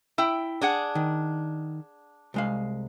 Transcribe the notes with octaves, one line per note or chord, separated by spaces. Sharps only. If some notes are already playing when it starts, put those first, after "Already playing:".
E4 G5
D4 G#4 F#5
D#3
C2 G#3 F5